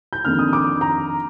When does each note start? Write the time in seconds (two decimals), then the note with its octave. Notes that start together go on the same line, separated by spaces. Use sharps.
0.13 G6
0.25 F2 D#3 A#3 D4 F6
0.39 D#6
0.53 D6
0.81 A#5